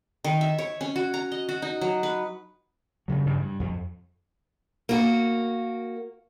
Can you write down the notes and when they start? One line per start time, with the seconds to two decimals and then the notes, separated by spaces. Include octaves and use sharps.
0.24 D#3
0.41 E5
0.58 C#5
0.81 C#4
0.96 F#4
1.14 A#5
1.32 D#5
1.49 F#4
1.62 D#4
1.81 F#3
2.03 B4
3.08 G2 C#3 F#3
3.26 G2 C#3 E3 G3
3.39 G2
3.60 F2
4.89 A#3 F#4